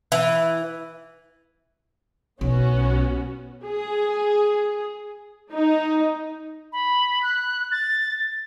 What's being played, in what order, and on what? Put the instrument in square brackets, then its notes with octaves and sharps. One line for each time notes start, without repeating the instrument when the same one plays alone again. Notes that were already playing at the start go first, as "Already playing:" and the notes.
[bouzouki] E3
[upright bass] B1 [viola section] B3 C#4 F#4
[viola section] G#4
D#4
[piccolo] B5
F#6
A6